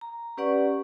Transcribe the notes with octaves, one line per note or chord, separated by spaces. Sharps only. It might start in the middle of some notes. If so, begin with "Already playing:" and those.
A#5
C#4 G4 B4 D5 F#5 C#6